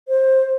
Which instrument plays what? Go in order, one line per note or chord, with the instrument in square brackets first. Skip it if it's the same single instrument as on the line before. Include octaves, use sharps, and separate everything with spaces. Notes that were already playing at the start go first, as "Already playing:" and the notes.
[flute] C5